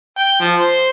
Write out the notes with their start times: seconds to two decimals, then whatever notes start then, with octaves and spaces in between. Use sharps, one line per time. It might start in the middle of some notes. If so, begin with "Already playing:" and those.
0.18 G5
0.41 F3
0.60 C5